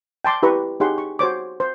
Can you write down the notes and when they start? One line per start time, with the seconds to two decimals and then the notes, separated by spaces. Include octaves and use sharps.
0.25 G5 A5 C6 D6
0.43 E4 G4 B4 A#5 C#6
0.80 D#4 G4 G#4 C#5 F#5 C6
0.98 C#6
1.19 F#4 C5 C#5 D6
1.60 C5